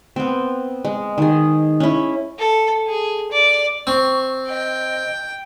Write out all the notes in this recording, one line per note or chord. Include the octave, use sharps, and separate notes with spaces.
B3 C4
G#3
D#3 G#4
C#4 E4
A4
G#4
D5
C4 C#6
D#5 G5